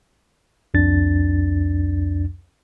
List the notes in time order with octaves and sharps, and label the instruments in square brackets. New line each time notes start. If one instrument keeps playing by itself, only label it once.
[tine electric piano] C2 F2 D4 A6